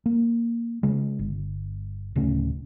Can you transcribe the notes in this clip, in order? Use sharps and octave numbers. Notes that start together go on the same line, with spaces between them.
A#3
C#3 G#3
G1
D1 C#3 A3 C#4